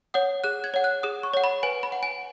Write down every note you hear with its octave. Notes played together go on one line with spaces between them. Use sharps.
C#5 F#5 D#6
G#4 F#6
G#6
C#5 F#5
F#6
G#4 D#6
C#6
C#5 F#5
B5
B4 G#5
B5
F#5
G#5